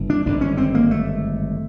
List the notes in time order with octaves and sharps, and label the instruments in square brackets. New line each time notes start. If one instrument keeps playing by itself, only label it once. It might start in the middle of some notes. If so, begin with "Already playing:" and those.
Already playing: [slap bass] G1 C#3
D4
G#1 G2 D3 D4
C#4
C4
A#3
A3